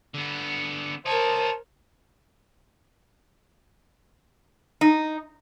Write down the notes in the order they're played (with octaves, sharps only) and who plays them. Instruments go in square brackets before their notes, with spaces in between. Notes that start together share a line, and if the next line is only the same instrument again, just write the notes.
[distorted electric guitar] D3 B3
[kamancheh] A#4 C5 [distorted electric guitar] C#5 D#5 [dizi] A5
[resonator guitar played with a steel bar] D#4